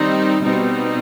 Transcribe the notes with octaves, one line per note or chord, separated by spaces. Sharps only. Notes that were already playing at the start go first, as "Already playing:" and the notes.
Already playing: D#3 G3 C4 D#4
B2 G3 C4 D#4